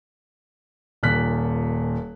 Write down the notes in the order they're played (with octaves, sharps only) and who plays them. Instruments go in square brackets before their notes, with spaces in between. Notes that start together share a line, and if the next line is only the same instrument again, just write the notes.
[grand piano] D#1 A#2 F#6 B6